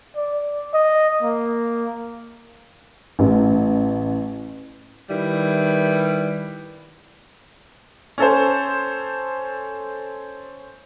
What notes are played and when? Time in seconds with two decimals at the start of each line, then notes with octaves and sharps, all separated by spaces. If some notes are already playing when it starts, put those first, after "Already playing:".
0.16 D5
0.74 D#5
1.23 A#3
3.19 A1
5.10 D#3 G3 E4 B4
8.18 C#4 A4 C5